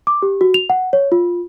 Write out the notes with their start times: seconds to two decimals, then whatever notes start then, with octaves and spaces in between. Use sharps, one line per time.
0.07 D6
0.22 G4
0.41 F#4
0.54 F7
0.70 F#5
0.93 C#5
1.12 F4